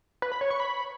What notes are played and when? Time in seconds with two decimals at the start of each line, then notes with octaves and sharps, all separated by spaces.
0.22 B4
0.32 B5
0.41 C#5
0.50 C#6
0.60 B5